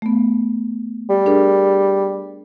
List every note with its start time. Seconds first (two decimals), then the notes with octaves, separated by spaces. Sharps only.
0.02 A3 B3
1.10 G3
1.26 D4 G#4 A#4